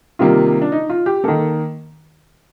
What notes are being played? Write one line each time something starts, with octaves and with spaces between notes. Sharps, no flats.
C3 D#3 G3 A#3 F4
D4
D#4
F4
G4
D#3 A#3 A4